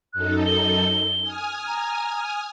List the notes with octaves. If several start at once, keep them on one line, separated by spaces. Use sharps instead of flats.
F#2 D#4 A4 F#6
G7
G#5 D#6 F6
A#5